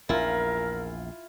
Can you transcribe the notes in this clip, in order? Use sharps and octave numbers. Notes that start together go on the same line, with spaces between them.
A#1 E2 E4 F4 A#4